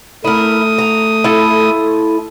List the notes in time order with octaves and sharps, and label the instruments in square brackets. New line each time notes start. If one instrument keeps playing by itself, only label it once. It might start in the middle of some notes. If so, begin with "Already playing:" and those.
[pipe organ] A3 D#6 [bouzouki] E4 A#4
[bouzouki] A#5
E4 F4 A4